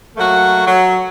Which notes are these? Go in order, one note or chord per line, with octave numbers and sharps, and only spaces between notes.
F#3 A3 A#3 F#4
F#3